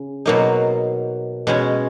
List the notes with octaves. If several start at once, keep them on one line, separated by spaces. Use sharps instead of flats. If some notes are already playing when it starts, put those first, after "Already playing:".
Already playing: C#3
B2 F#3 A#3 D#4
B2 G#3 C#4